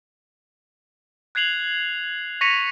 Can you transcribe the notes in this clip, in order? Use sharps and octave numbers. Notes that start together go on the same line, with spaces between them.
F#6 G#6 C7 F7 F#7
C#6 A#6 B6 C#7 D#7 F7